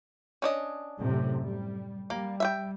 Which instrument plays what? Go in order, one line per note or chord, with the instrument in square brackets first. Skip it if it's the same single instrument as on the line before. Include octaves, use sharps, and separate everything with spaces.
[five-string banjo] C#4 D4 D#5
[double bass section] F#2 A2 C3
G3
[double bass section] G3 [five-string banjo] A#3
[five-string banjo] E5 F#5 G5